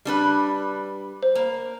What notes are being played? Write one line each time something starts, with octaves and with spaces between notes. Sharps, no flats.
G3 D4 B4
C5
A#3